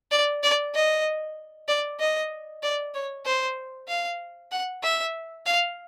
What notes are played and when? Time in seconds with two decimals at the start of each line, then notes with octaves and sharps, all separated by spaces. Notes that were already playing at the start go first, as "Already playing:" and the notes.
0.11 D5
0.43 D5
0.75 D#5
1.68 D5
2.00 D#5
2.63 D5
2.94 C#5
3.26 C5
3.88 F5
4.52 F#5
4.83 E5
5.46 F5